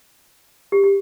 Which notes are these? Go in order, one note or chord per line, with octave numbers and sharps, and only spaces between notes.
G4
G4